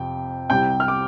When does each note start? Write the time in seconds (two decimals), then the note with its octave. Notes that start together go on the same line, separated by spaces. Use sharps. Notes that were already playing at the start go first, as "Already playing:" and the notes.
Already playing: F2 C3 G5
0.50 C2 C3 G5 G6
0.80 F6
0.88 D6